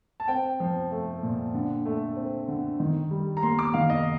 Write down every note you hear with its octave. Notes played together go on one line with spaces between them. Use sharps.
A5
C4 G5
F3
A3
A#2
D3
A3
C4
D3
D#3
G3
A#5
A#3 C6
D6
D#3 F5
D#5